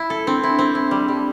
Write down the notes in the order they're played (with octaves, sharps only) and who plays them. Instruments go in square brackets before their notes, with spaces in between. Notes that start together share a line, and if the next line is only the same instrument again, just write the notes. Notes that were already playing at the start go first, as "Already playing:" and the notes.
Already playing: [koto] E4
A4
[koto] C4 [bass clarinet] D4
[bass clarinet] D4 [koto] E4
[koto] C4
E4
G3
G3